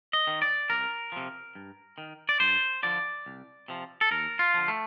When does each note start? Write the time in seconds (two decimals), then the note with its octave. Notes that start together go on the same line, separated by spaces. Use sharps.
0.13 D#5
0.27 D#3
0.42 D5
0.70 C2 A#4
1.12 C3 F3
1.55 G2
1.98 D#3
2.29 D5
2.40 G2 C5
2.83 D3 F3 D5
3.26 C2
3.68 C3 F3
4.01 A4
4.11 D#2 A#4
4.39 F4
4.54 D3 F3
4.68 A3